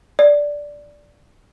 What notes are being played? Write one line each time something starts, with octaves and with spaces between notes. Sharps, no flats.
D5